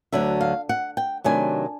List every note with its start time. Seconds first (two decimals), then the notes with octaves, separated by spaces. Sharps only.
0.12 D2 D3 F#3 E5
0.41 F5
0.69 F#5
0.97 G5
1.24 C3 D#3 F#3 A3 D4 G#5